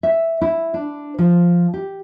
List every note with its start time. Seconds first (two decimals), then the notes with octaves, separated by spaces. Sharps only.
0.03 E5
0.41 E4
0.74 D4
1.19 F3
1.74 G4